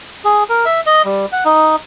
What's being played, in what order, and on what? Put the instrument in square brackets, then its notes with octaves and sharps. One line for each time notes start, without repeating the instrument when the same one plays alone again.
[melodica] G#4
A#4
E5
D#5
G3
F#5
D#4